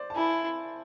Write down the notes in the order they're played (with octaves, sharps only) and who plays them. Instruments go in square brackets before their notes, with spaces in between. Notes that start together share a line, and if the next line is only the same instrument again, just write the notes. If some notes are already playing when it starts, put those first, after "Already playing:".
Already playing: [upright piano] C5 D5
A5
[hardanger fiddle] E4 [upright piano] G#5